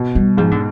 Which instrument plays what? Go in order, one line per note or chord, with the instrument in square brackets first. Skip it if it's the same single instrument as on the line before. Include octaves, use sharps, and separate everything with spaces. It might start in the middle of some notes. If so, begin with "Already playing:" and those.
Already playing: [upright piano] B2
[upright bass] G3
[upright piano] G#2 [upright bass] F3
[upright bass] D3